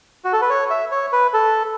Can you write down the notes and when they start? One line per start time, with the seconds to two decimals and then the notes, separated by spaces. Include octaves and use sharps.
0.24 F#4
0.33 A4
0.42 B4
0.50 C#5
0.70 E5
0.92 C#5
1.13 B4
1.34 A4